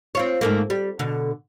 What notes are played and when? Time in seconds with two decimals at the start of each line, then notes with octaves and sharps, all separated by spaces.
0.15 C4 F4 C#5
0.41 G#2 A3 A#3
0.70 G3
0.99 B2 D3